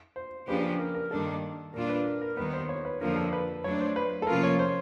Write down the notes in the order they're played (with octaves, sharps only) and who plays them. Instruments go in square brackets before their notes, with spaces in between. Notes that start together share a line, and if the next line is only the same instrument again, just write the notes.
[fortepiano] C5
[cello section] C#3 F3 A#3 D4 G4 [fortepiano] B4
[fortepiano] A#4
A#4
[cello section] G2 D#3 G3 A#3 D4 [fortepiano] A4
[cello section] A#2 G3 A#3 D4 F4 [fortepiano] A#4
[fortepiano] B4
A#4
A#4
[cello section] D#2 D#3 G3 B3 [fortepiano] B4
[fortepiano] C5
C#5
B4
[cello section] F2 D3 F3 A#3 [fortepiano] A#4
[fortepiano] A4
B4
[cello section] F#3 A3 D4 [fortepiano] C#5
[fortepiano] C5
B4
A4
[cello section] C3 F3 A#3 C#4 F4 [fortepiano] A#4
[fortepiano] C#5
C5